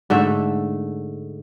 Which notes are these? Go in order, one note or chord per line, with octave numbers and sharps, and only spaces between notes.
G#2 D3 A3 E5